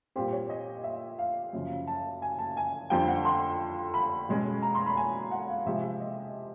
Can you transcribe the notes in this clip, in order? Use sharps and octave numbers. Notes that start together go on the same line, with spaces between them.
A#2 G3 C4 G4
C#5
D#5
E5
F5
F#2 C#3 F3
A5
G#5
A5
G#5
F2 D3 G3 C4 G5
F#5
C6
B5
B2 G#3 C#4
A#5
C6
B5
G#5
F#5
F5
C3 F3 G#3 E5
D#5